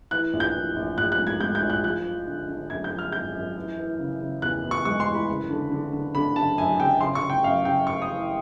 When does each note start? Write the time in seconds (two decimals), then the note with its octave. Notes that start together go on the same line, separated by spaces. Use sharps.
0.11 E3 F#6
0.33 A#1
0.40 G6
0.55 E3
0.76 A#1
0.98 A#1 F#6
1.12 F#6
1.19 G#2
1.27 G#6
1.41 G#2 G6
1.55 G6
1.62 A#1
1.70 F#6
1.84 F3 F#6
2.05 F3
2.27 D3
2.48 D3
2.70 F#2 G#6
2.84 G6
2.92 F3
2.99 F6
3.12 G#1 G6
3.34 F#2
3.56 E3
3.78 E3
3.99 C#3
4.21 C#3
4.42 E2 F#6
4.64 E2
4.71 C#6
4.85 G#3 C#6
5.00 C6
5.07 E3
5.15 B5
5.28 F#1
5.50 D3
5.71 D3
5.93 D3
6.15 D3 B5
6.36 F#1 A5
6.58 F#2 G#5
6.79 F#1 G5
7.01 C#3 C6
7.15 C#6
7.22 C#3
7.30 G5
7.44 F#2 F5
7.65 C#3 G5
7.87 F#2 C#6
8.02 D#6
8.08 E3